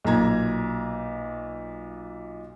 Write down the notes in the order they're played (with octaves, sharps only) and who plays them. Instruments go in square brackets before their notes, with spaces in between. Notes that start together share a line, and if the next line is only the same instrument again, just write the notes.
[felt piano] B1 A#2 A#5 G#6